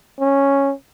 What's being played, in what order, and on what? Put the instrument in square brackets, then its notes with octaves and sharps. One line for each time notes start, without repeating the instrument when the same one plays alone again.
[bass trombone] C#4